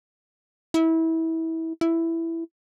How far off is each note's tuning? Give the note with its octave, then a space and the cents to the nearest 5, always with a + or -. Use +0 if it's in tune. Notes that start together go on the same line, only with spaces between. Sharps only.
E4 -25
E4 +5